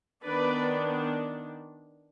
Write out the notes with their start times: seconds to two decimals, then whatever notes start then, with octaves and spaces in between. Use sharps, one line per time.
0.24 D#3 B3 D4 B4 D5